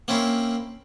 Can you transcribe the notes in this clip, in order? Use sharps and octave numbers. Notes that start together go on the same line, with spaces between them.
A#3 C4 C#4 E4